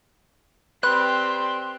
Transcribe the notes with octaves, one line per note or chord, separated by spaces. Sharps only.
C4 G4 B4 D5 C6 F#6